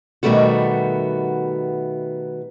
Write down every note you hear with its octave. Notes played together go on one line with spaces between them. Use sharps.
B2 D#3 G3 A3 B3 F#4